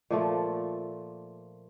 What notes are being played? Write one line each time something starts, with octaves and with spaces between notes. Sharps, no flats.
A#2 F3 A3